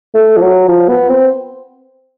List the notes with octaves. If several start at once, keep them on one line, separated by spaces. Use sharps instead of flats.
A3
F3
F#3
F3
B3
C4